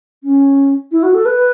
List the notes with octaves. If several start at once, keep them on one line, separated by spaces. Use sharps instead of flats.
C#4
E4
F#4
A4
B4